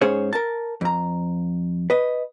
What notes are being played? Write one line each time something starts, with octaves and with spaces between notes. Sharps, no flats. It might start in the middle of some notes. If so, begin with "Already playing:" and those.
G#2 C#4 G#4 C5 C#5
A#4 A5
F2 A#5
B4 D#5